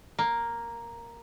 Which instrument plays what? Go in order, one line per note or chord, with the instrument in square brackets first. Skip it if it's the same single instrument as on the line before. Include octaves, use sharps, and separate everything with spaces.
[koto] A#3